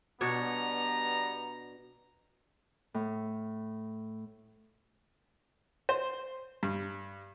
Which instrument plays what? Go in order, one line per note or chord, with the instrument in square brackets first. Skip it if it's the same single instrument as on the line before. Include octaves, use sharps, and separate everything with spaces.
[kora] B2 D4 C#5 [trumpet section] G3 B3 A#5
[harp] A2
[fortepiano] C5
G2